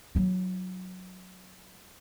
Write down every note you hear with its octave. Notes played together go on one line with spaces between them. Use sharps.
F#3 E4